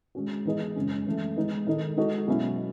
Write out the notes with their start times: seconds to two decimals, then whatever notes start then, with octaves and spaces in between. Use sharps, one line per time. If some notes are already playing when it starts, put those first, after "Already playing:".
0.15 G#3 C#4 F#4
0.45 E3 B3 D#4 G#4 D#5
0.76 F#2 C#3 G#3 C#4
1.06 F#2 E3 A3
1.36 G#3 B3 D#4
1.67 D#3 G#3 D#4 A4 D#5
1.97 G#3 D#4 F#4 A4 D#5
2.28 B2 F#3 C#4 E4